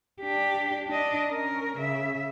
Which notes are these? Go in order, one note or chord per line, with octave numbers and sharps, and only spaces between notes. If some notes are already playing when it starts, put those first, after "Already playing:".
D4 G4
D4 D#5
C#4 A#4
C#3 E5